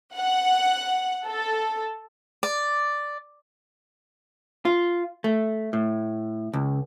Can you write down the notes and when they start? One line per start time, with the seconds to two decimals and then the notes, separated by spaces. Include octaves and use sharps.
0.15 F#5
1.25 A4
2.43 D5
4.65 F4
5.24 A3
5.73 A2
6.53 C#2